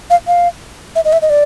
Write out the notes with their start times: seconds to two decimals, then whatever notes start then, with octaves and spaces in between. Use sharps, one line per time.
0.10 F5
0.27 F5
0.96 E5
1.05 D#5
1.13 E5
1.22 D#5
1.30 D5